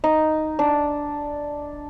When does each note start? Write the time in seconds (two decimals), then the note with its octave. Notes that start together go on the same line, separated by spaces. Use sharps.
0.04 D#4
0.59 D4